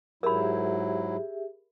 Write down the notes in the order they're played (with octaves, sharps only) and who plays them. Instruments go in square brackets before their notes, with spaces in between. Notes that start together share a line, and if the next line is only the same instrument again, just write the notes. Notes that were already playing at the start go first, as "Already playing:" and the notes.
[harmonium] G#2 F#3 E4 [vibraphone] G4 G#4 E5 [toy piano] A#4 B5